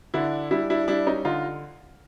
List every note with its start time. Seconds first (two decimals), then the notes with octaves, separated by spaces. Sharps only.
0.14 D3 D4 E4
0.51 G3 D4 E4
0.70 D4 E4
0.88 G3 D4 E4
1.07 C#4 D#4
1.25 D3 D#4 F4